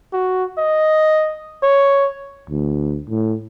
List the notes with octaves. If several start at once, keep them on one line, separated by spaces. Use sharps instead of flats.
F#4
D#5
C#5
D2
A2